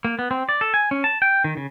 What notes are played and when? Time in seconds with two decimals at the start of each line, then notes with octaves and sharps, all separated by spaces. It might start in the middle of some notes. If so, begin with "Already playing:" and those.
0.05 A#3
0.19 B3
0.31 C4
0.49 D5
0.61 A4
0.74 G#5
0.91 C#4
1.04 A5
1.22 G5
1.44 D#3
1.57 C#3